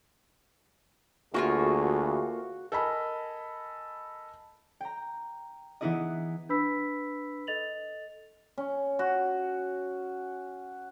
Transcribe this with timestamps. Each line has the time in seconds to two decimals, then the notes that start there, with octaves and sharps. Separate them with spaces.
1.34 D2 A#3 D#4 F4 F#4 G#4 C#6
2.72 A4 A#4 D#5 G#5 B5
4.81 G5 A#5
5.81 E3 B3 D#4 E4 G#4 D#5
6.49 D4 B4 B5 E6 B6
7.47 A4 D#5 A6 F7 F#7
8.58 C#4
8.99 F#4